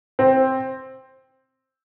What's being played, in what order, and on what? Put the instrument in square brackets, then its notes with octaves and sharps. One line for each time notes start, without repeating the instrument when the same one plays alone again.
[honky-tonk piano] C4